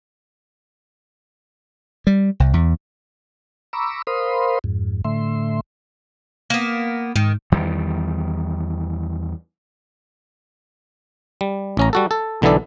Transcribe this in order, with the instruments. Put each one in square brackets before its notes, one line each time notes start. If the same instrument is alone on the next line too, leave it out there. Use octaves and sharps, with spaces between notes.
[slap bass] G3
C2
E2
[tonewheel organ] A#5 B5 C#6 D6 E6
A#4 C5 F5 B5 C6 D#6
F2 G#2
A2 D3 A3 E5 C6
[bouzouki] A#3 B3
[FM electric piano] G#2 [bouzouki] D#3
[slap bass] E2 D#3 G3
[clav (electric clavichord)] G3
A1 C#4 A#5
G3 F#4 A4
A4
B1 D3 E3 B3 A4 D5